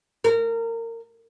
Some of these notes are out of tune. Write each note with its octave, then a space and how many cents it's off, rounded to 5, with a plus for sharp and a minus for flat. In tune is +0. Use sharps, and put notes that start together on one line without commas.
A#4 -25